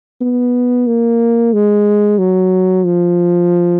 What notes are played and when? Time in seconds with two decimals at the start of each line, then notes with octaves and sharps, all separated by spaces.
0.21 B3
0.87 A#3
1.53 G#3
2.18 F#3
2.85 F3